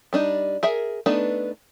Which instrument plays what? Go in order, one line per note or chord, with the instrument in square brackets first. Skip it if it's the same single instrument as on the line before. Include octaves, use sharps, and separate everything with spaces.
[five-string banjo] G3 D4 D#4
G#4 A#4 E5
A3 B3 D4 D#4 B4